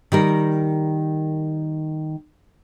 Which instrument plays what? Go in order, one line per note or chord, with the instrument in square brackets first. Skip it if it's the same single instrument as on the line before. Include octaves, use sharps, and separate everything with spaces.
[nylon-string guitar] D#3 G3 A#4